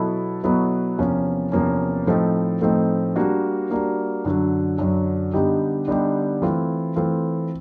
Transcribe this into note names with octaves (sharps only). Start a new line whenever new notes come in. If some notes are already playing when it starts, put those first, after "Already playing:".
Already playing: B2 F#3 B3 E4 A4
B2 F#3 B3 E4 A4
E2 C3 F3 A#3 C#4
E2 C3 F3 A#3 C#4
A2 F3 A3 C4 D#4
A2 F3 A3 C4 D#4
G3 A#3 D4 F#4
G3 A#3 D4 F#4
F#2 D3 F#3
F#2 D3 F#3
D3 G3 B3 D#4 G4
D3 G3 B3 D#4 G4
E3 A3 C4 F4
E3 A3 C4 F4